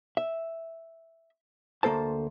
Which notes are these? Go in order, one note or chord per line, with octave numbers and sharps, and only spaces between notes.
E5
D2 A#3 A4 C5 A5